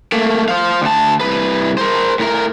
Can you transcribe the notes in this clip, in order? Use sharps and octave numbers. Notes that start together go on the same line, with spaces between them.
A3 A#3
C5 F5
D2 A5
C2 B4
A#4 C5
A2 A#4